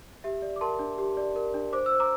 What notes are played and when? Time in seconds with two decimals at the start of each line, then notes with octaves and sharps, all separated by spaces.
0.24 G4 E5
0.42 D5
0.56 D6
0.61 A#4 A5 C6
0.79 D4
0.98 G4
1.17 D5
1.36 A#4
1.54 D4
1.73 C5 D6
1.86 E6
1.91 C5
2.00 A#5 D6